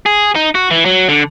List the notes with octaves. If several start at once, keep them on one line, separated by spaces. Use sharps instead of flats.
G#4
D#4
F#4
E3
F#3
D3